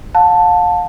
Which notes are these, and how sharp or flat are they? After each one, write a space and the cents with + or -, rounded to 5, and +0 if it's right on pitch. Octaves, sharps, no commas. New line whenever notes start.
F5 +40 A5 +5